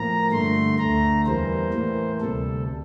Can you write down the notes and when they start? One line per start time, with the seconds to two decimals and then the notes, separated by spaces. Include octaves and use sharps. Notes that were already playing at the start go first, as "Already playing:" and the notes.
Already playing: A2 F3 A#3 A#5
0.31 G2 D3 A3 C6
0.78 D2 D3 A3 A#5
1.26 E2 E3 G3 A#3 C5
1.73 A2 E3 A#3
2.20 D2 C3 G3 A4